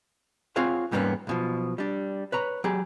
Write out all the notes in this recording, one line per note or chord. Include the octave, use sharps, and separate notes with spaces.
C4 F4 G#4 C#5 F5 F#5
E2 G#2 G3 A#3 B3 C#4
B1 B2 F3
G3 D4
B4 C#5 A#5
F#3 G4 G#4